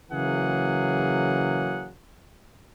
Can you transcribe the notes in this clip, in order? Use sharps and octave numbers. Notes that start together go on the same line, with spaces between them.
C#3 E3 F#3 A#3 G#4 F#5